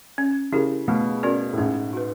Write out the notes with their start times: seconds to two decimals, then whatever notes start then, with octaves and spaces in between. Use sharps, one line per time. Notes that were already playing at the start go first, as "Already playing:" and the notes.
0.18 C#4
0.52 C#3 E4 G4 A#4
0.88 B2 A3
1.23 C#4 F#4 A#4 D5
1.53 A2
1.58 G#2 C#4
1.93 F#4 B4